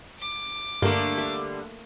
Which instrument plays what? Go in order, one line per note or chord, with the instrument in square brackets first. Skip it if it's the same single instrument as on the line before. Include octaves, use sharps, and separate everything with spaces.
[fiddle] D6
[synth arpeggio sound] G2 [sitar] D3 G3 [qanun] A3 A#3
[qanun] E5